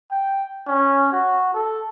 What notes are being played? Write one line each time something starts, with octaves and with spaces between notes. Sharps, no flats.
G5
C#4
F#4
A4